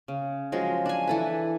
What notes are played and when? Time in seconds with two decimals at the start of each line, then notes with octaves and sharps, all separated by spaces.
0.08 C#3
0.52 F3 F#3 G#3
0.86 D4 G#5
1.07 E3 A4 B4